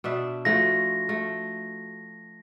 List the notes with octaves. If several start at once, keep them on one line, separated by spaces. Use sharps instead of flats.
B2 D4 E5
F3 A3 F#4 A#6
A3